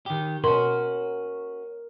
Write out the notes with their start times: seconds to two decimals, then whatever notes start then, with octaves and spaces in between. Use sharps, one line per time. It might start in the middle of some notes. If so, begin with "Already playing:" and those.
0.06 D#3 G4
0.44 B2 C#4 F#4 A#4 C6